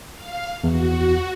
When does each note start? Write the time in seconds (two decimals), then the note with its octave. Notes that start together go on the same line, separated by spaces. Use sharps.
0.13 F5
0.64 E2 F#4